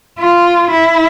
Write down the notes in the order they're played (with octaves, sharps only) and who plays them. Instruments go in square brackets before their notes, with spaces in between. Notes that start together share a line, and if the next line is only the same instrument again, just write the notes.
[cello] F4
E4